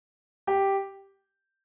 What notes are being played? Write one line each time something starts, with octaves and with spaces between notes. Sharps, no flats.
G4